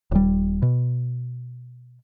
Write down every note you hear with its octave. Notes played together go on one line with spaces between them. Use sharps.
D#1 G3
B2